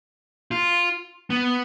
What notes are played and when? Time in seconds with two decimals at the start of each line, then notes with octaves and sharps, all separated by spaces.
0.51 F4
1.30 B3